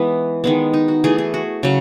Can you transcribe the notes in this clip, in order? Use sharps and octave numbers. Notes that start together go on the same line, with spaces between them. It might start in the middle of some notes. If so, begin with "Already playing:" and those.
Already playing: E3 G#3 B3
D#3 G#3 B3
D#4
F#4
E3 A3 G#4
G#4
F#4
C#3 F#3